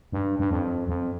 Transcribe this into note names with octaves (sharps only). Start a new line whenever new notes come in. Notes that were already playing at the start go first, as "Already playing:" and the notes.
G2
G2
F2
F2